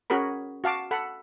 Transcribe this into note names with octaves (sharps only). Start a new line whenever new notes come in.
C#4 F#4 G#4 A#4 B5
F#4 F5 A5 D6
A4 F#5 B5